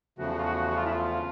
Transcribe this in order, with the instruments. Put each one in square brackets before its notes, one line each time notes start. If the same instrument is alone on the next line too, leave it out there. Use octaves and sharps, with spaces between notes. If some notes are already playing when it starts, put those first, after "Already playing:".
[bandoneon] E2 C#3 F3 A3 [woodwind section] F#4
[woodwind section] F#4
F4
F#4
F#4
F#4
F4
E4
F4